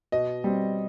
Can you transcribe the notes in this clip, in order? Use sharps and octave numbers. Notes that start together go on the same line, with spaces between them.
B2 D#5
G3 C4